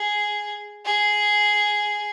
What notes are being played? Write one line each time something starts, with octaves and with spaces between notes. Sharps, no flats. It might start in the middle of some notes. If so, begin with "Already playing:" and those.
Already playing: G#4
G#4